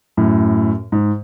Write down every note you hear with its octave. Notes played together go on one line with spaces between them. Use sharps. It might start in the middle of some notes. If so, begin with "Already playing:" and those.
F#2 A2
G#2